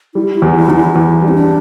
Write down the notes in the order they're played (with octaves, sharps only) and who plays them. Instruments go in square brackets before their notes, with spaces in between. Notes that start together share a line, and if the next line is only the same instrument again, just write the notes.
[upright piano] G3 [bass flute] E4
[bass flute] E4
[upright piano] E2
[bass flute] E4
[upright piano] E2 [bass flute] D4
[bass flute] E4
[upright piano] E2 [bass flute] E4
[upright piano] G3
[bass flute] C4
D4